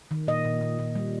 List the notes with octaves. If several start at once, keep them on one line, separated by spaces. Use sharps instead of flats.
D#3
A#2 D#5
A#2
A#2
A#2
G3